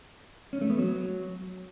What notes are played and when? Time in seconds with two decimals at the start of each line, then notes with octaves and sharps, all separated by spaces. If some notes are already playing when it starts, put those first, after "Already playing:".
0.53 C#4
0.61 A3
0.70 B3
0.78 F#3